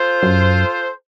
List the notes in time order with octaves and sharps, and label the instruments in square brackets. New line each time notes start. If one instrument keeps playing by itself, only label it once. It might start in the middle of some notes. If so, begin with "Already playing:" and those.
Already playing: [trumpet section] F4 A4 C5
[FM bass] F#2